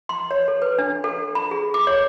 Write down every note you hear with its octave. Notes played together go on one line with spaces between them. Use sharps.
C6
C#5
A4
B4
D4
A4
B5
G#4
D6
C#5